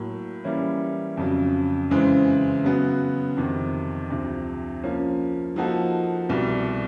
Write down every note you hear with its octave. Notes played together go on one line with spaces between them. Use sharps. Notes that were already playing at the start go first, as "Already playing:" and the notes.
Already playing: A2 F#3 A#3
E3 G3 A#3 C#4 E4
F2 C#3 F#3
F#2 C#3 E3 G#3 C4
C#3 F#3 B3
F2 C3 D#3
D2 C3 F3
F3 A#3 C#4
F3 A#3 D#4 F#4 A4
C2 B2 G3